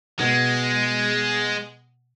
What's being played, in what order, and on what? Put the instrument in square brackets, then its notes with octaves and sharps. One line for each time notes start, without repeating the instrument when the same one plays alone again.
[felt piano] B2 [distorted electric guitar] G#3